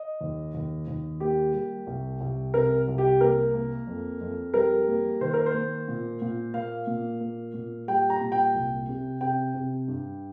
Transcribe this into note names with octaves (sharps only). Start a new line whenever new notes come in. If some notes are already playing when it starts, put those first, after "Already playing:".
Already playing: D#5
D#2
D#2
D#2
A#3 G4
G3
C2
C2
C3 A#4
C2
G4
A#3 A#4
A#3
F2
F2
G3 A#4
A#3
D#3 C5
A#4
C5
A#3
A#2
A#2
A#3 F5
A#2
A#3
A#2
G3 G5
A#5
A#2
G5
C2
C3
C3 G5
C3
G2